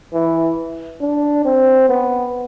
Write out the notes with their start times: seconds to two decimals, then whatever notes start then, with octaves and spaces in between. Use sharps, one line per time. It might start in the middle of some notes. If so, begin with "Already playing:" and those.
0.13 E3
1.01 D4
1.45 C4
1.89 B3